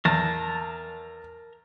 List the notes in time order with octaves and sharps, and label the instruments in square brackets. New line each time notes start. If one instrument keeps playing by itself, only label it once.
[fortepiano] E2 [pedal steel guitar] A#4 A5 A#5